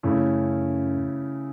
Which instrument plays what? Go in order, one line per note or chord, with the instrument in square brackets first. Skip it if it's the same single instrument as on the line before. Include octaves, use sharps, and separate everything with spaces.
[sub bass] F#2 [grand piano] C#3 A3 C#4 E4